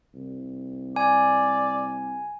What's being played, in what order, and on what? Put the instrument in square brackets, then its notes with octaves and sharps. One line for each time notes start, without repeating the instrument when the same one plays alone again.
[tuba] C2
[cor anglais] D5 [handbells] G#5